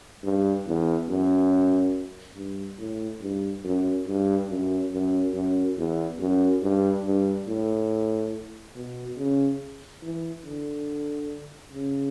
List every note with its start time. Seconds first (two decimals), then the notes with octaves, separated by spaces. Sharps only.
0.23 G2
0.66 E2
1.09 F#2
2.36 G2
2.79 A2
3.21 G2
3.64 F#2
4.07 G2
4.50 F#2
4.93 F#2
5.34 F#2
5.78 E2
6.19 F#2
6.62 G2
7.04 G2
7.48 A2
8.75 B2
9.17 C#3
10.03 E3
10.46 D3
11.73 C#3